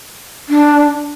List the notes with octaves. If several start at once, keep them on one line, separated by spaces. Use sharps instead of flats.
D4